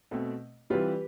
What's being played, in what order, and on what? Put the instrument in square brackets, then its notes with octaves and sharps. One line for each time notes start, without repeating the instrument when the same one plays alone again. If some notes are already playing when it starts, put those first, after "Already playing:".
[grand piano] B2 A3 C4
[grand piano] E3 G3 C4 F4 [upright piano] G4 B4